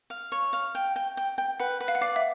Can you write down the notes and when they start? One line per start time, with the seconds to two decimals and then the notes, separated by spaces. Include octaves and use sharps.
0.10 F5
0.32 C#5
0.53 F5
0.75 G5
0.96 G5
1.17 G5
1.38 G5
1.60 B4 F#5
1.80 B4
1.88 F5
1.95 F#5
2.01 D5 F5
2.16 E5